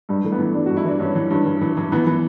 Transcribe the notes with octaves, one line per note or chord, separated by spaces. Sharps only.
G2 G3
E3 A3
B3
E3
G2 D4
F#4
G2
E4
E3 D4
G2 C#4
E3
G2
E3
E3
E3
E3 B3
E3